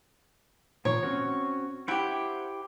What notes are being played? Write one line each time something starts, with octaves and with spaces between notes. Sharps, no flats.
A#2 D#3 F3 C#5
C4 C#4 F#4
E4 G4 C5 F#5 G5